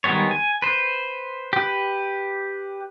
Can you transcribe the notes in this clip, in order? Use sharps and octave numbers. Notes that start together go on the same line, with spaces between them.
D#3 G3 G#3 B3 C#5
G#5
B4 C5
G4 B4